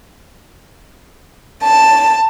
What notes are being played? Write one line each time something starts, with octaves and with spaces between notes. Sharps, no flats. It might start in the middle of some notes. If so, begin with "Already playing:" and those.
A5